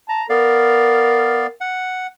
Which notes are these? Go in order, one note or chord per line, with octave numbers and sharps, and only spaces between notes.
A5 A#5
B3 A#4 D5 F5
F#5